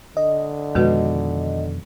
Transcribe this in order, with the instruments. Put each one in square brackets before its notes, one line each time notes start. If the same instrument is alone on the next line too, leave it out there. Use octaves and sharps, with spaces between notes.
[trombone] D3 [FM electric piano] D#5
[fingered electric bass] F2 B2 D#3 [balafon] G#3 F#4 B4